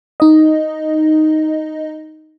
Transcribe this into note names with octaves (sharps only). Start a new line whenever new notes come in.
D#4 D#5